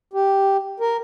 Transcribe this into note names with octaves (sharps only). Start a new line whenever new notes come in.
G4
A#4